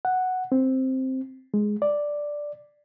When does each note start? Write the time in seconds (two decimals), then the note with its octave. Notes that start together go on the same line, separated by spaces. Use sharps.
0.05 F#5
0.52 C4
1.54 G#3
1.82 D5